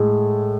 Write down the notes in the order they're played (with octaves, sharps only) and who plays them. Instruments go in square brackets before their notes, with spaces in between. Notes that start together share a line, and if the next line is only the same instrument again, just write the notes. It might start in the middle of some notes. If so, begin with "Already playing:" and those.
Already playing: [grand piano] A2 G#3